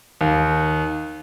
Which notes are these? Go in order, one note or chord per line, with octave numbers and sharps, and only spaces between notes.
D#2